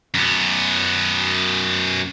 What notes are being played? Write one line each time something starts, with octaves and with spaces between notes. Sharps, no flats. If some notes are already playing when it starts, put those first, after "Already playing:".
F#2 B3